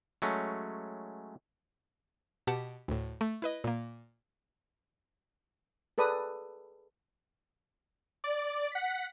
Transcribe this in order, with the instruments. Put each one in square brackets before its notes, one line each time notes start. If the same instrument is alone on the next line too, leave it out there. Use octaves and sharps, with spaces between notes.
[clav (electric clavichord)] F#3 G#3 A3 C#4
[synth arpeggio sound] B2 G4 F#5 A5
D2 A2
A3
E4 B4 D#5
A#2 A#3
[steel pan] G#4 A4 B4 D5 D#6
[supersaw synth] D5
F#5 B6